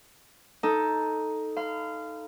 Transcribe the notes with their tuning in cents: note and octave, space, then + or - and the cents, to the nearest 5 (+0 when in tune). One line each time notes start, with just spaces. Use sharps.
D#4 +5 A4 +0
F5 -15 B5 +45